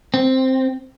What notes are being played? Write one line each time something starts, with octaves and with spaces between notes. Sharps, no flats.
C4